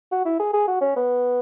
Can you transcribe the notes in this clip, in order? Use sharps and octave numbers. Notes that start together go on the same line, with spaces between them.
F#4
E4
G#4
G#4
F#4
C#4
B3